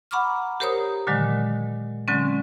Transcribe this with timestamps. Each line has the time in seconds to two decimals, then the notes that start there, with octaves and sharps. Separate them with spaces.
0.11 F#5 A#5 B5 C#6 D6 F6
0.60 G4 A#4 C5 C#5 A#5 D#6
1.07 A#2 D3 D#3 F#3 G#3
2.08 D3 F#3 G#3 C4 C#4